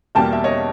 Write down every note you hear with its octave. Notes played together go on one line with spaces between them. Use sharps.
E2 B2 G3 A#3 G5 A5
E5
C#5 D#5